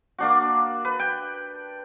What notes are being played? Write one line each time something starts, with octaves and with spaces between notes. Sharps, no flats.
A#3 D4 F#4
B4
G5